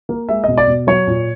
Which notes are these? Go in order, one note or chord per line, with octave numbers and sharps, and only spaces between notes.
A#3
G#3 E5
B2 D#5
D5
B2
F#3 C#5
A#2